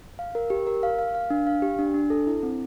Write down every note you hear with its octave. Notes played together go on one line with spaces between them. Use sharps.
F5
A#4
G4
A#4
F5
F5
F5
D4
F5
G4
D4
D4
A4
E4
C4